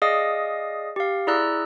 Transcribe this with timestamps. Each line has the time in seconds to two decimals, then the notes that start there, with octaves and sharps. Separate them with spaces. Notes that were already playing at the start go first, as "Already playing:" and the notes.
0.02 G#4 D5 D#5 F5 D#6
0.96 G4 F5
1.27 E4 G#4 D5 A#5 E6 F#6